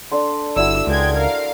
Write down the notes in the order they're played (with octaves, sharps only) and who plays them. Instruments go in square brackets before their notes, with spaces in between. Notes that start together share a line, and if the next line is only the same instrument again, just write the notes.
[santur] D4 A4 C6
[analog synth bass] G1 [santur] D4 E4 F#4 [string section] E6
[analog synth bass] C#2 [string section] G#3 G5 G#6
[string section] A#4 F5